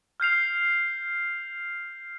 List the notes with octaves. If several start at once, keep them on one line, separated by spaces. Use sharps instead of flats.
F6 G6 C7 F7